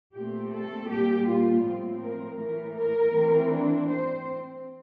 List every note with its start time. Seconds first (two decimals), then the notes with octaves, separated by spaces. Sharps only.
0.14 A#2 A3 C4 G4
0.52 A4
0.89 A#2 G3 A#3 G4
1.27 F4
1.64 A2 F3 C4
2.01 A#4
2.39 A2 E3 A3 A#4
2.76 A#4
3.14 E3 A3 C4
3.51 D4
3.89 C4 C5